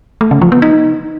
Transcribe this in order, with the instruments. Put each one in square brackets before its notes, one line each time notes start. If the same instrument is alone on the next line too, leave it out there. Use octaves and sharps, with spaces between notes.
[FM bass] A3
C#3
F3
B3
D#4